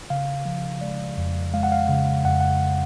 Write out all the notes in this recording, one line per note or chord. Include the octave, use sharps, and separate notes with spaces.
C#3 F5
F3
G#3 D5
F2
G#3 F5
F#5
F5
C#3
F2 F#5
F#5